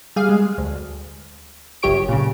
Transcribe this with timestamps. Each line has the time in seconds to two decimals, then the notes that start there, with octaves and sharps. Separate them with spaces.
0.16 G3 G#4 F5
0.29 G#3
0.58 D2
1.83 G1 C#2 F#2 G4 C#5 D7
2.09 A#2 C#3